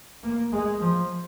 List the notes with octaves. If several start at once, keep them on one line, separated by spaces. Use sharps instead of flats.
A#3
G#3
F3